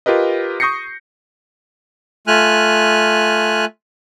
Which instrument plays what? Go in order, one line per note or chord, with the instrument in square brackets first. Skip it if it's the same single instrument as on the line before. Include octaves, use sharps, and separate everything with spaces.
[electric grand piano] F4 G4 A#4 B4 D#5
C#6 D#6 G6 A#6 C7 C#7
[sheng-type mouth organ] A3 F4 G#5 F6 F#6